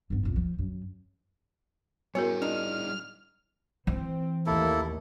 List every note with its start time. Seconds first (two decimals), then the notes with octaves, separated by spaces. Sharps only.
0.10 G2 B3
0.23 A#1 F2
0.36 F3
0.58 F#2
2.15 G3 B3 E4 F#4 G#4 A#4 C#5
2.42 D4 D#4 F6
3.87 E3 C4
4.46 A1 D#2 A#3 E4 A4